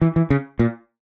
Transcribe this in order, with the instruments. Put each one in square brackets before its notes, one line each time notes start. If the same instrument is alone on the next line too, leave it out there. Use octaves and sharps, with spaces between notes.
[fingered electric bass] E3
E3
C#3
A#2